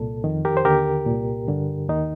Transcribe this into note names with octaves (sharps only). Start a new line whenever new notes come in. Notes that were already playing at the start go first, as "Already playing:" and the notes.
Already playing: C2 A#2 A4
F2 D#3
G4 A#4
C5
D#2 D3 G4 A#4
C2 A#2
G2 D3
D#2 D#3 D#4